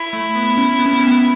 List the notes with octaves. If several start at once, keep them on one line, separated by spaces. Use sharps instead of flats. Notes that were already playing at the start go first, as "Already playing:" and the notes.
Already playing: E4
A3
B3
C#4
B3
C#4
B3
C#4
B3